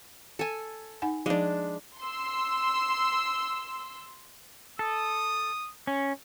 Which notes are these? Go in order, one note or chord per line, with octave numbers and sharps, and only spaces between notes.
A4 G#5
D#4 F#5 G#5
F3 G#3 D4 D#4 F5
C6 E6
A4 D#6
C#4